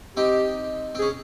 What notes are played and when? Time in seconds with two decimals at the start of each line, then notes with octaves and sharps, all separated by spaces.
0.17 C4 D#4 G4
0.95 C4
0.99 C#4 G#4